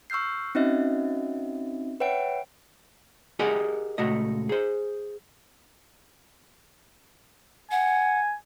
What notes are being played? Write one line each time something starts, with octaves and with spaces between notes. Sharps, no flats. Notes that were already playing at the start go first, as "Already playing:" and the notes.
C#6 E6 F6 G6 C7
C4 C#4 D#4 F#4 D#5 E5
B4 C#5 E5 F#5 G5 D7
G4 G#4 A#4 D#5 F#5 G#5
C#2 A#2 A3 F#4 D#5
G#4 C5
F#5 G#5